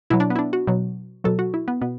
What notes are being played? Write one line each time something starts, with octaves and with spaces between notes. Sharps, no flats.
B2 F#3 E4
D4
B3
E4
D4
F#4
B2 F#3
B2 F#3 A4
F#4
E4
B3
B2 B3